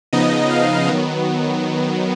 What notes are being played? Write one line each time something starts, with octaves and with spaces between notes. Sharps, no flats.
C#3 F3 B3 D#4 D#5
F5
D#3 F#3 B3